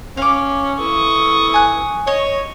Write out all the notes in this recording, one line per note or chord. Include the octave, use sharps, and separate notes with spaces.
C#4 F5 D6
E3 E4 A4 C#6 D#6
G#5 F#6
C#5 D#5